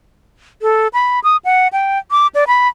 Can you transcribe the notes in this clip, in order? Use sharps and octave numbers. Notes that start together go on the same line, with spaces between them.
A4
B5
D#6
F#5
G5
D6
D5
B5